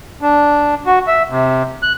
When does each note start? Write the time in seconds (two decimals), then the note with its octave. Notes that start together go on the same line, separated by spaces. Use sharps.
0.22 D4
0.86 F#4
1.07 E5
1.30 C3
1.83 F#6